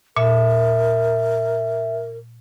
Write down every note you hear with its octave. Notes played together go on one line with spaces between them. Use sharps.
A#2 A#4 E5